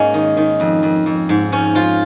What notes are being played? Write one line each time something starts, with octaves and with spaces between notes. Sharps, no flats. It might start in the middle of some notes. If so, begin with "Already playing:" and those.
Already playing: G#2 G#3 A#3 C#4
D#3
D#3
F2
F2
F2
G#2
F3 C#4
F3 F4